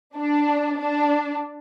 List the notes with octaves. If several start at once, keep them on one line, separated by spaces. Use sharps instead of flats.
D4
D4